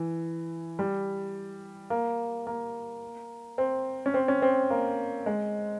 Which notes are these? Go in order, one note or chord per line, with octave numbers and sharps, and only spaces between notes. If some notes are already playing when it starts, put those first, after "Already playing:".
Already playing: E3
G3
A#3
A#3
C4
C#4
C4
C#4
C4
A#3
G#3